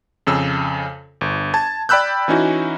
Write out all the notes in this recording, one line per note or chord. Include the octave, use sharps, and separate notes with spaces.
F2 C#3 E6
G1
A5 G#6
D5 G5 B5 E6 F#6 G6
E3 C#4 D#4 E4 F#4